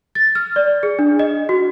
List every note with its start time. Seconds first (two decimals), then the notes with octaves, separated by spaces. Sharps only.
0.15 A6
0.35 F6
0.56 D5
0.83 G#4
0.99 D4
1.19 D#5
1.49 F#4